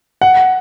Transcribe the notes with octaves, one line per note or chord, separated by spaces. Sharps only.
F#5